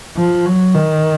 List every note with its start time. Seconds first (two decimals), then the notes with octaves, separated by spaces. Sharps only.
0.17 F3
0.46 F#3
0.75 D#3